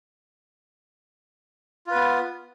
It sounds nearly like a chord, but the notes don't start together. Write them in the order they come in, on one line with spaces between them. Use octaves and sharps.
F4 B4 B3